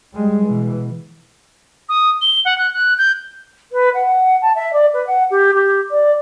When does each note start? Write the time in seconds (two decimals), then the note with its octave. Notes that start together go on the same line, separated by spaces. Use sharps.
0.13 G3 G#3
0.45 B2 E3
1.89 D#6
2.22 G7
2.45 F#5
2.58 F#6
2.73 F#6
2.98 G6
3.72 B4
3.94 F#5
4.41 A5
4.55 E5
4.73 D5
4.93 B4
5.06 F#5
5.31 G4
5.54 G4
5.91 D5